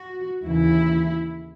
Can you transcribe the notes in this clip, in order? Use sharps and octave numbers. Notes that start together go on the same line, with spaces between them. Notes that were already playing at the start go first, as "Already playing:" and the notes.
Already playing: F#4
D#2 C#3 E3 E4